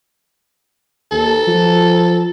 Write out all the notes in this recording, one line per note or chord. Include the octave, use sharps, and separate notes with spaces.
D#2 A4
F3